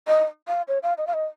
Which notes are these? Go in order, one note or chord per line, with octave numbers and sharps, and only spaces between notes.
D#5
F5
C#5
F5
D#5
F5
D#5